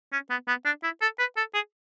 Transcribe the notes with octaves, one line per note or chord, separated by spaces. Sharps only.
C#4
B3
B3
D4
E4
A4
B4
A4
G#4